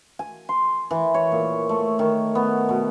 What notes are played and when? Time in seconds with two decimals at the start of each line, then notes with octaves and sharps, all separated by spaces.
0.19 G#5
0.49 C6
0.91 E3
1.14 C#5
1.32 A#2
1.69 A3
1.99 D#3
2.35 B3
2.69 B2